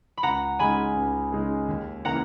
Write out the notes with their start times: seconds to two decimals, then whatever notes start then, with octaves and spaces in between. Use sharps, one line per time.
0.17 B5
0.23 C#2 F#5 A#5
0.59 C#3 G#3 D#4 G#4 G#5 B5
0.96 C#2
1.32 C#3 G#3 D#4 G#4
1.68 D#2
2.05 C#3 E3 A#3 E4 F#5 A#5